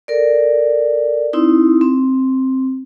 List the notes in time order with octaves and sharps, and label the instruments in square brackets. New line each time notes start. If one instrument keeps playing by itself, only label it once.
[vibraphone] A4 A#4 D5
C4 D#4 E4
C4